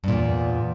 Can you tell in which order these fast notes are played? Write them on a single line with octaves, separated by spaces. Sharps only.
G2 A#2 E2